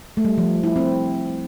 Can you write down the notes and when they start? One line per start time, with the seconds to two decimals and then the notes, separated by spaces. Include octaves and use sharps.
0.17 A3
0.25 G3
0.38 F3
0.64 E4
0.76 C4